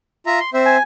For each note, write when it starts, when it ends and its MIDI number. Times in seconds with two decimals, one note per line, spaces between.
0.26 0.40 65
0.26 0.40 76
0.26 0.40 82
0.40 0.50 84
0.54 0.77 60
0.54 0.77 72
0.54 0.77 76
0.66 0.83 80